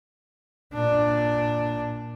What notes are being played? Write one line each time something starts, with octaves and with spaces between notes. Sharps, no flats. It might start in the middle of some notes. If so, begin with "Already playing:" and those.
A#2 D4